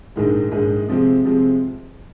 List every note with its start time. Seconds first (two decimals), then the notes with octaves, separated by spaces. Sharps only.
0.16 A#1 G#2 D#3 G#3
0.52 A#1 G#2 D#3 G#3
0.89 C3 F3 G#3 C4
1.25 C3 F3 G#3 C4